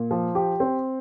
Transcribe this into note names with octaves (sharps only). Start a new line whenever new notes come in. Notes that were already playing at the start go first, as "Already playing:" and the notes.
Already playing: A#2
F3
G4
C4